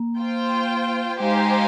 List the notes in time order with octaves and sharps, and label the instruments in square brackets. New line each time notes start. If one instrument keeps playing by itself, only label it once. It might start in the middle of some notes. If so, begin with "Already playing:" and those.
Already playing: [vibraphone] A#3
[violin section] F4 C5 G5
[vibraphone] G#3 [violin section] D#4 G4 C5 F5 G#5